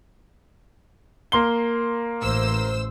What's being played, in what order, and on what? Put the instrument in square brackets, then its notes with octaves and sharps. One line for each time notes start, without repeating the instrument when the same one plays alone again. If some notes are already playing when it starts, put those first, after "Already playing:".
[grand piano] A#3 C6 G7
[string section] A1 C5 E6